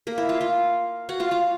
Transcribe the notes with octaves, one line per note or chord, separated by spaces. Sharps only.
A#3 A#4
E4 E5
F4 F5
F4 F5
F#4 F#5
F4 F5
F4 F5